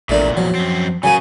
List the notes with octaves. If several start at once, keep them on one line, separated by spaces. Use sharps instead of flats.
A#1 E2 A#2 A3 D4 A#4
F3 F#3
F#2 C4
C#3 F#3 A#3 G#4 G#5